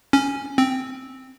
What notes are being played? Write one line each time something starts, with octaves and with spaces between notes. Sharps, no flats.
C#4
C4